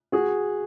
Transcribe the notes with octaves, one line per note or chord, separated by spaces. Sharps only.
F#4 G#4